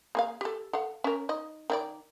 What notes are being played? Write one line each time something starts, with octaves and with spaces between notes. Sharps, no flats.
A#3 G#4 F5
G4 A4
A4 F5 F#5
C#4 A#4
D#4 D#5
D#3 E4 D5